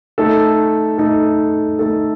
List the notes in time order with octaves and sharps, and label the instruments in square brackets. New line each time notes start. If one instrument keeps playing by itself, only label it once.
[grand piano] A3 D#4 A4
A3 D#4 A4
A3 D#4 A4